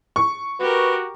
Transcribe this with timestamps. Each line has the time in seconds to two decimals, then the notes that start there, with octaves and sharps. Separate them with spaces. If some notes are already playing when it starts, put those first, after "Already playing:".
0.16 C#6
0.60 F#4 G4 A#4 B4